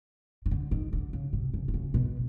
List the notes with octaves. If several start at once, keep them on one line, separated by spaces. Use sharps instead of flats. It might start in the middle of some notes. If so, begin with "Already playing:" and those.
D#3
D3
D#3
D3
C#3
C3
C#3
C3
C#3
B2